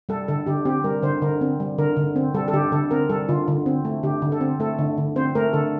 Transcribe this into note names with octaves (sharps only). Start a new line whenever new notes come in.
G3 A4
D3 A4
D3 G4
C4 G4
G3 A#4
D3 C5
D3 A#4
C4
G3
D3 A#4
D3
C4
G3 A4
A4
D3 G4
D3 A4
C4 A#4
G3 A4
D3 F4
D3
C4
A3
D3 G4
D3
A4
C4
A3 A4
D3
D3
C4 C5
A3 A#4
D3 A4